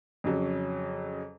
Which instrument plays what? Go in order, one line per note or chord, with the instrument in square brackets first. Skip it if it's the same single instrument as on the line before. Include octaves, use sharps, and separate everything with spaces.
[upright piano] F2 C#3 F#3 C#4